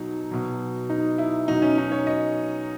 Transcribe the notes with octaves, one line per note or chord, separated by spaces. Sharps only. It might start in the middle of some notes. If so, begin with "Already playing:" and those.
Already playing: B2 F#3 D#4
B2 F#3
D#4
E4
B2 F#3 D#4
C#4
D#4
C#5
D#5